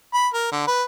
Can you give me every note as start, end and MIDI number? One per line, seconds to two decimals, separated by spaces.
0.14 0.28 83
0.34 0.47 70
0.52 0.64 50
0.67 0.83 71